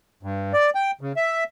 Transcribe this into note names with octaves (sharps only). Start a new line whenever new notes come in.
G2
D5
G5
C#3
E5